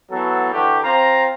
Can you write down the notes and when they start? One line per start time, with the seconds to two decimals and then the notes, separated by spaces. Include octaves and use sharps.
0.11 E3 F#3 B3 F#4 A4
0.53 D3 E3 F#4 G4
0.84 C4 F4 A#5